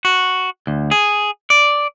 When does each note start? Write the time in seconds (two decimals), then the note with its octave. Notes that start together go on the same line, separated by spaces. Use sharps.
0.05 F#4
0.67 D2
0.91 G#4
1.50 D5